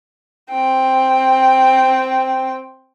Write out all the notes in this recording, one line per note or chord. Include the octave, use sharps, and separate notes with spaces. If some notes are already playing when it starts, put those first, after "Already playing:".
C4 G5